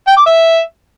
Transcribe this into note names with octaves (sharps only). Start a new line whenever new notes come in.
G5
D6
E5